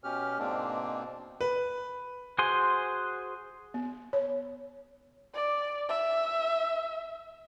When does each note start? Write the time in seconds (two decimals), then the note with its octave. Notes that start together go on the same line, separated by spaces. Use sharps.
0.04 B2 C#4 G4 F6
0.39 G#2 B2 G#3 A#3 C4 D4
1.41 B4
2.39 F#4 G#4 C5 G#5 C6
3.74 B3
4.13 C#5
5.34 D5
5.89 E5